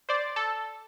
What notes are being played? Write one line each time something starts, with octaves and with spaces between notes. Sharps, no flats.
C5 D5
A4